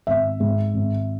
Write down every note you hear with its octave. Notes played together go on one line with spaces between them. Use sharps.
G#1 E5
G#2
G#1